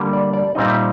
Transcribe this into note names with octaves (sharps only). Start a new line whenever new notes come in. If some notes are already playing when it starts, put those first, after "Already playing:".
Already playing: D3 G3 A#3
D5
D5
A#2 G3 C4 D#4 D#5
E5